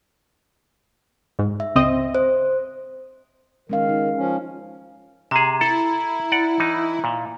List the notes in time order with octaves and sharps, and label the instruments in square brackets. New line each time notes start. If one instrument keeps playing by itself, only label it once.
[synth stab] G#2
[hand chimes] E5
[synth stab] C#2 C4 D#5
[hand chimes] C5
[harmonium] D#3 [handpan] G#3 C#4 F5
[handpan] D#4
[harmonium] F3 C#4
[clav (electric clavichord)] C3 G#4 [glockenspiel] A#5
[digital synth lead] E4 [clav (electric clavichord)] A4
[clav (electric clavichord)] D5 F#5
E3 D#4
A#2